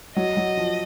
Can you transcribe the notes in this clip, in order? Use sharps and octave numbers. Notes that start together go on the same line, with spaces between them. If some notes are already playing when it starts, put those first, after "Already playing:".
F#3 D#5
F#3
F3